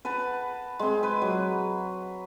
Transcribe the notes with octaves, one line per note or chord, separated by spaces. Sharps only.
B4 F#5 A5 A#5
G#3 C4
B4
F#3